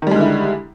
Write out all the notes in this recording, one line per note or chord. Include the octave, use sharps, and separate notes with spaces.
D3 D#3 G3 G#3 E4